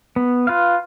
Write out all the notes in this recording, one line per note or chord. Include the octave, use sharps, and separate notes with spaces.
B3
F4 B4 F5